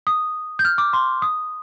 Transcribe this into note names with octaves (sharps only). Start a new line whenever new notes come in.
D#6
G6
F6
D6
C6
D#6